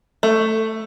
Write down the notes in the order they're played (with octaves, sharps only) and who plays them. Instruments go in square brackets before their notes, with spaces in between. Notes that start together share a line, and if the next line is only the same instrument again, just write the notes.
[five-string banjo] A3